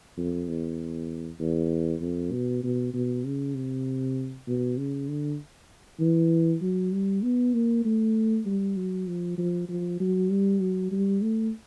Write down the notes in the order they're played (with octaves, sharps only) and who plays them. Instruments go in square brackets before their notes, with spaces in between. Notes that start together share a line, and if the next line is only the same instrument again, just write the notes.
[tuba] F2
E2
E2
F2
B2
B2
B2
C#3
C3
B2
C#3
D3
E3
F#3
G3
B3
A#3
A3
G3
F#3
F3
F3
F3
F#3
G3
F#3
G3
A3